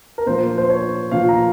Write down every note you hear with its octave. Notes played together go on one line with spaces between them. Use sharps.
A#4
A#2 F3 A#3 C5
C5
C#5
A#2 F3 A#3 F5
A#5